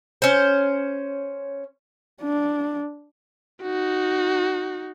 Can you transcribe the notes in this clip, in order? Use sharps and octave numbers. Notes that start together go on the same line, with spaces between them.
C#4 C5
D4
D#4 F#4